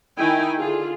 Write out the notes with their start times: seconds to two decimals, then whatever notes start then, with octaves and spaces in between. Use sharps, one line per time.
0.17 D#3 D#4 E4 G5 G#5
0.58 D3 F4 G#4